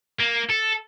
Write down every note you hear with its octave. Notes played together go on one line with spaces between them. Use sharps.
A#3
A4